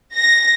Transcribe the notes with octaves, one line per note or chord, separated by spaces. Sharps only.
A#6